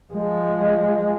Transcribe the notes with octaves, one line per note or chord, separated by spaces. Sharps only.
F3 G#3